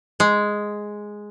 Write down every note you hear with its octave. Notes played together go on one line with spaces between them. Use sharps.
G#3